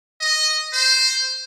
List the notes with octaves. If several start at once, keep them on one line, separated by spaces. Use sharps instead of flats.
D#5
C5